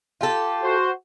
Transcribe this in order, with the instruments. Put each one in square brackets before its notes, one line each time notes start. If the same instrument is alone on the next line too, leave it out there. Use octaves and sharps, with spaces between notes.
[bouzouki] F4 G4 A4
[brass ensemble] F#4 C5